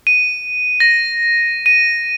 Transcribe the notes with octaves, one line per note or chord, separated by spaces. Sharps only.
D#7
A#6
D#7